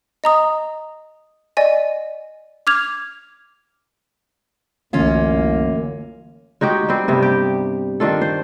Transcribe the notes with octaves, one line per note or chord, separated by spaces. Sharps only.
D#5 A#5 D#6
D5 D#5 G#5
D6 F6 G#6 F7
C2 F#2 D3 E3 A3 A#3 C#4 F4
G#3 D#4 F#4 G4
G3 C4
G2 C3 B3
G4
D#3 D4 F4 A4
C5